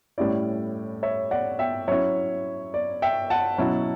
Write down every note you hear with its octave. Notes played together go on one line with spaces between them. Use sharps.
A2 G3 C#4 E4 D5
C#5 E5
D5 F#5
E5 G5
F#3 C#4 E4 C#5 E5
D5
E5 G5
F#5 A5
B2 F#3 C#4 E4